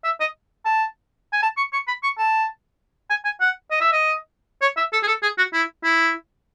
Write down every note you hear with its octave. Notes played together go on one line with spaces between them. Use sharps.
E5
D#5
A5
G#5
A5
C#6
C#6
B5
C#6
A5
G#5
G#5
F#5
D#5
E5
D#5
C#5
E5
A4
G#4
A4
G#4
F#4
E4
E4